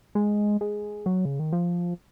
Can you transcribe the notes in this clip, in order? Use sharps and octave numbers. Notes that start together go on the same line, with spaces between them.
G#3
G#3
F#3
C#3
D#3
F3